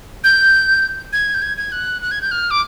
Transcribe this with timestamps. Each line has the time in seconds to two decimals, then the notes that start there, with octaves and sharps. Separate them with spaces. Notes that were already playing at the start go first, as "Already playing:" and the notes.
0.24 G6
1.13 G#6
1.34 G6
1.42 G#6
1.58 G#6
1.72 F#6
2.02 F#6
2.11 G#6
2.21 G6
2.31 F6
2.51 D6